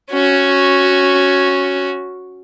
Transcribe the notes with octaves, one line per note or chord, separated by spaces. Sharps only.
C#4 F#4